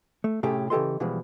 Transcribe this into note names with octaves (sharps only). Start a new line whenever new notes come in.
A3
A2 C3 A3 C#4 G4 G#4
C#3 E3 G4 A4 D#5 C6
B2 E3 F3 G3 G#3